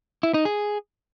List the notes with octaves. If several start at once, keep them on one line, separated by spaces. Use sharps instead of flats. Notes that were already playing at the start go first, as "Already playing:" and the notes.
E4
D#4
G#4